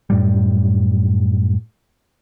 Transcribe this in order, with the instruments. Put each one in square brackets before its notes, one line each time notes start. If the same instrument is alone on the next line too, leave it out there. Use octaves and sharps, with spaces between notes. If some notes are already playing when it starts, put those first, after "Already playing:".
[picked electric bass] F#2 A2 G3